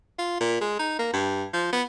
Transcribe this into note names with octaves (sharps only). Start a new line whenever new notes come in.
F4
A#2
G#3
D#4
A#3
G2
F3
B3